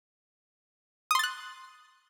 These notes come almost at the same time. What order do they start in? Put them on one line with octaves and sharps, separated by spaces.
D#6 C6 A6 F#6